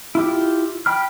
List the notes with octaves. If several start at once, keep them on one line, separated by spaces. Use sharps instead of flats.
E4 F4 G4
G5 B5 F6